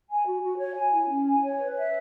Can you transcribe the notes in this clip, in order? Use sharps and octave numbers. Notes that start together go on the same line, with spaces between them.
G#5
F#4
F#4
C#5
G#5
E4
C#4
G#5
C#5
B4
E5